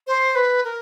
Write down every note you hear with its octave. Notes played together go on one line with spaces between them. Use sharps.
C5
B4
A#4